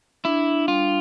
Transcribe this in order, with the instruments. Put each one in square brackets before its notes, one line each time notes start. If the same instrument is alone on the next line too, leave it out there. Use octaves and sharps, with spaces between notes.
[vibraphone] D4 [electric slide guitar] E4
[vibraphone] G3 [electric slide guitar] F4